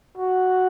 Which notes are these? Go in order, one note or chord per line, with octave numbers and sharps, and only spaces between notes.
F#4